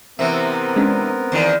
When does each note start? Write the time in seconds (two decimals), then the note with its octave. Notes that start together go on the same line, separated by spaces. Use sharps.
0.19 C3 E3 B3 C4 A#4 E5
0.76 G#3 C#4 D4
1.32 E2 D#3